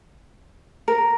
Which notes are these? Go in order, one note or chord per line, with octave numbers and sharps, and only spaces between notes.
A#4